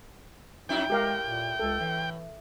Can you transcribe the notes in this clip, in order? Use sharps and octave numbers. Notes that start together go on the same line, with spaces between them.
F2 F#3 D#4 E4 G5
A2 G#3 G4 A#4 F5
A#2
C#2 A4
A2 E3